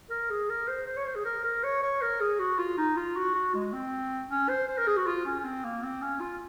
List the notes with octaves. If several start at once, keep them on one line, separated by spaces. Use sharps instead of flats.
A#4
G#4
A#4
C5
C5
C#5
C5
G#4
A#4
A#4
C#5
C#5
A#4
G#4
F#4
F4
D#4
F4
F#4
F#4
G#3
C4
C#4
C5
C5
A#4
G#4
F#4
F4
C#4
C#4
C4
A#3
C4
C#4
F4